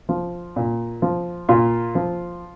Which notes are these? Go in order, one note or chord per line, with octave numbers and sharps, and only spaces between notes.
F3
A#2
F3
A#2 F4
F3